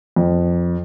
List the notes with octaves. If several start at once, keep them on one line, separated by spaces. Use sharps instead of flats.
F2